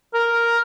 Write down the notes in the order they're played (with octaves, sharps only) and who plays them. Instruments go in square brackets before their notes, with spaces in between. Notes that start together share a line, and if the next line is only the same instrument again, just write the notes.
[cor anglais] A#4